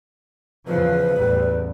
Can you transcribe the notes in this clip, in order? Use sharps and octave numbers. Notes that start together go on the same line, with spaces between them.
E2 C#3 F3 B4
A1 E2 G3